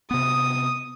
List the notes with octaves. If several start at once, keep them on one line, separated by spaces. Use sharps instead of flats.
C3 B3 D#6